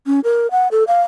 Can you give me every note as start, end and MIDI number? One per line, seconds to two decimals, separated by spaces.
0.07 0.20 61
0.24 0.50 70
0.51 0.68 78
0.71 0.84 69
0.87 1.02 77